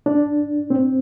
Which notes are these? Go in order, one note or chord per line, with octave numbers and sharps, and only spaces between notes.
D4
C4